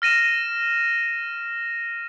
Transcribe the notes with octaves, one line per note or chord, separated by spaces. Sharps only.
F6 A#6 D#7 E7